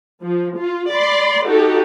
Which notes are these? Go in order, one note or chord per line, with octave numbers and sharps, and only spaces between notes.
F3
F4
D5 B5 C6
D#4 F#4 G4 A4